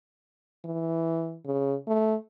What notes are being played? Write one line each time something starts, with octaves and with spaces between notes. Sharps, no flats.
E3
C#3
A3